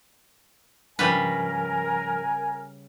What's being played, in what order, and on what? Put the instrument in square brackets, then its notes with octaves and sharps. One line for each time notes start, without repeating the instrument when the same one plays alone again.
[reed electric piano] G#2 F3 B5 [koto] C#3 G3 B4 [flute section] A#4 [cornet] G#5